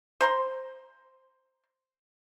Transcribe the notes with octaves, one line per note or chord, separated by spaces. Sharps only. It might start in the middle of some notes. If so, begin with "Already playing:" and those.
C5 A#5 C6